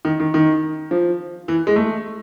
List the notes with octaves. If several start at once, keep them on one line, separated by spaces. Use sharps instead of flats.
D#3
D#3
D#3
F3
E3
G#3
A3